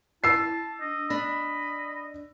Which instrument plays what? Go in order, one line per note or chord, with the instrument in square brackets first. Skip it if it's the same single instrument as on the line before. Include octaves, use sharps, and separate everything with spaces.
[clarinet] E4 [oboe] A5 [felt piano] E6 C7
[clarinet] D4 [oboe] D#5
[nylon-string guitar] D4 [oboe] D#5 [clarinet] B5